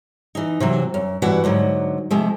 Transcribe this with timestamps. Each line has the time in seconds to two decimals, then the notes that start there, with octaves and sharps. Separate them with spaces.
0.35 E3 D#4
0.60 C3 E3 F#3
0.94 F#2
1.22 G2 E3 E4 F#4 B4 F#5
1.44 G#2 D3 F#3
2.11 C3 F3 G#3 A3